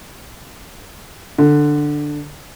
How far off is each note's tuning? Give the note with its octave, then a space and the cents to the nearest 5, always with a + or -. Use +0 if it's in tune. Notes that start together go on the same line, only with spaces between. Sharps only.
D3 +10